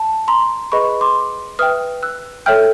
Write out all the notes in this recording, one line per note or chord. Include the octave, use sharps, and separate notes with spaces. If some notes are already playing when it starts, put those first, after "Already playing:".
Already playing: A5
A#5 C6
G#4 B4 D#5 B5 C#6
C6 D6
B4 E5 G5 D#6 F6
E6 F#6
A4 C#5 E5 G5 F6 G6